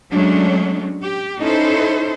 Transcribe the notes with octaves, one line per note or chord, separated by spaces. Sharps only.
F#3 G#3 A3 C#4 D4
G4
C#4 D#4 E4 A4 C5